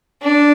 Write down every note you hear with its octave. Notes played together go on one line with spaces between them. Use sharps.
D4